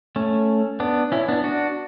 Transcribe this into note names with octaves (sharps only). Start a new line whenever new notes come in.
A3 C#4
B3 D4
C#4 E4
B3 D4
D4 F#4